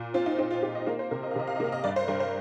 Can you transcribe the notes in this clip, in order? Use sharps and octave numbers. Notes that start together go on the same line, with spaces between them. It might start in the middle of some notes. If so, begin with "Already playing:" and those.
Already playing: A#2
C4 F4
D#4
C4 D#4
F4
C4 G4
D#5
A#3 F5
C5
C3 A#4
D#5
F5
C3 D#5
F5
D#5
A#3 F5
D#5
G2 D5
C5
G2 A#4
C5